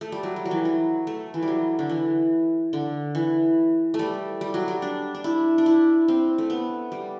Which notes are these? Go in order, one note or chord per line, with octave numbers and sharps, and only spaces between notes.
A3
G3
F#3
G3
F#3
E3
F#3
A3
E3
G3
F#3
D3
E3
D3
E3
A3
G3
G3
F#3
G3
D4
D4
E4
D4
E4
C4
A3
B3
G3